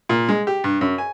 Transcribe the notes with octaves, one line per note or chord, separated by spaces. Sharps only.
A#2
G#3
G4
G2
F#2
G#5